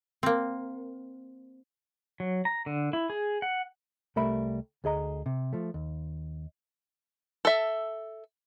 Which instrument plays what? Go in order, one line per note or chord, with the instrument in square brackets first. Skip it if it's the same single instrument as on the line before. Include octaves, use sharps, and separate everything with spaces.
[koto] A#3 C4
[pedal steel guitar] F#3
A#5
D3
E4
G#4
F#5
[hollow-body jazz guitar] C2 G3 A3 A#4 E5 B5
D2 G#4 D#5 A#5
C3
F3 A3
D#2
[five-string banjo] A4 E5